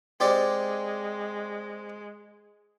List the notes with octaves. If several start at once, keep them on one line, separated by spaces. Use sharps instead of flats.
G#3 C4 G4 D5